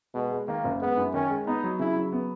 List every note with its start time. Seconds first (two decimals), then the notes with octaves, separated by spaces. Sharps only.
0.14 B2 G#3
0.31 G#3
0.48 D#3 A#3
0.64 F#1
0.81 G#3 B3
0.97 F#2
1.13 D#3 C#4
1.30 G#3
1.46 B3 D#4
1.64 F#3
1.79 C#3 E4
1.96 F#3
2.13 B3